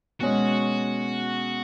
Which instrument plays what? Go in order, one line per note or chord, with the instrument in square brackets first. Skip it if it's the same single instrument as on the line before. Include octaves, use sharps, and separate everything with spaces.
[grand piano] B2 G#3 C#4 [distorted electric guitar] F#4